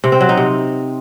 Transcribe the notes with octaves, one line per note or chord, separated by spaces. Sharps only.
C3
C4
F#3
D#4
C3